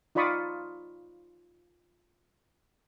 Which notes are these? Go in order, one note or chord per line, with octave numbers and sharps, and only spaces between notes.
D#4 F4 D5 B5 C#6 D#6